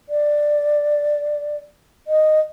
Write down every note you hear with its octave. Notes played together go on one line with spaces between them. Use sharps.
D5
D#5